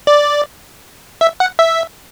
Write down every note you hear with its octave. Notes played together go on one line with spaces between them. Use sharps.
D5
E5
F#5
E5